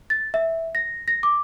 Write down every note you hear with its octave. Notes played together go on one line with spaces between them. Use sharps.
A6
E5
A#6
A#6
D6